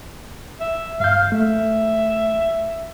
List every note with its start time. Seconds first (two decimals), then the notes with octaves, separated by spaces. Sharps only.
0.60 E5
1.00 G2 F5 G6
1.32 A3 E5